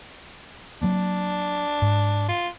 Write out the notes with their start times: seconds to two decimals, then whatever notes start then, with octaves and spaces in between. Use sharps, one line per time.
0.82 F#3 A#3 C4 D4
1.82 G#2
2.29 F4